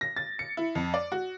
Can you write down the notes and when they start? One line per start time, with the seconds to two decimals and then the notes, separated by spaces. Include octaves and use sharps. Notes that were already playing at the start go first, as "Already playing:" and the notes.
0.01 A#6
0.17 A6
0.39 C#7
0.57 E4
0.75 F2
0.94 D5
1.12 F#4